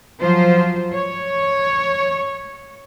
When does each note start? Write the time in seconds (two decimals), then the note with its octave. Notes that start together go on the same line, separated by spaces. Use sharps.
0.20 F3 F#3 F4 C5
0.92 C#5